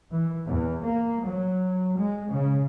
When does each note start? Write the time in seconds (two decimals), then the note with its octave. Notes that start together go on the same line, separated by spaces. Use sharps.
0.10 E3
0.46 E2
0.84 A#3
1.24 F#3
1.98 G#3
2.31 C#3